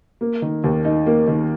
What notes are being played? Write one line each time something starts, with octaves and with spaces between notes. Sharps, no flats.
A#3
D#3
D#2
D#4
A#3
D#3